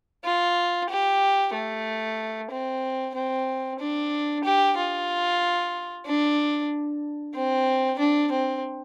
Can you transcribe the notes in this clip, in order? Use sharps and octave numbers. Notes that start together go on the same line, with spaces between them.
F4
G4
A3
C4
C4
D4
G4
F4
D4
C4
D4
C4